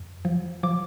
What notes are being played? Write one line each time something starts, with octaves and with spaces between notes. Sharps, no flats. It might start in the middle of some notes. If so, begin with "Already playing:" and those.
Already playing: F2
F3
F3 D6